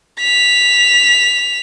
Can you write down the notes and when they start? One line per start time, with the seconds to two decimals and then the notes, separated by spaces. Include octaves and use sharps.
0.21 B6 F7